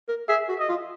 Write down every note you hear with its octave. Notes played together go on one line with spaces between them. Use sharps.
A#4
G#4 E5
F#4
D#5
F4